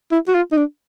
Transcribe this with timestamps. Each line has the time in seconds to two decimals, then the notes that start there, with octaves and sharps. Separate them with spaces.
0.12 E4
0.28 F#4
0.35 F4
0.52 D#4
0.57 D4